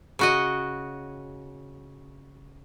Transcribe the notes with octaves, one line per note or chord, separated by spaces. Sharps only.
C#3 F#4 D#5